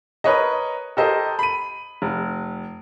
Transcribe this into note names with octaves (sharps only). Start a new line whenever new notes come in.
A#4 B4 C#5 D#5
G4 A4 A#4 C5 D#5
B5 D#7
F1